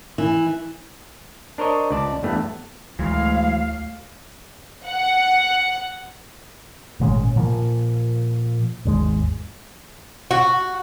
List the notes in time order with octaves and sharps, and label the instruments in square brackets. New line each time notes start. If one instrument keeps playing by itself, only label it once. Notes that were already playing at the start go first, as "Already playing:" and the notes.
[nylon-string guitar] E3
[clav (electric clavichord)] D4 A#4 C5 C#5 D#5
C#2 D5 A5
E2 G2 A3 B3
[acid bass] D2 [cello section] A2 F5 [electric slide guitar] E3 F#3 G#3
[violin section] F#5
[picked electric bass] G#1 A#2 G#3 C#4
A#2 F3 A#3
G#1 D#2 G#3
[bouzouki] F#4